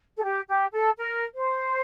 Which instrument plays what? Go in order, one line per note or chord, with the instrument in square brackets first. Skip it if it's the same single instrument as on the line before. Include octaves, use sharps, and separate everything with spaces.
[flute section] A4
G4
G4
A4
A#4
C5